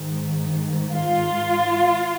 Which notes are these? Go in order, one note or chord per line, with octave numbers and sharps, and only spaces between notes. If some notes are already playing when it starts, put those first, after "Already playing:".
Already playing: G#2 D#3
F4